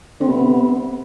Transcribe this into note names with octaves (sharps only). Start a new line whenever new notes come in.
D3 C4
C3 B3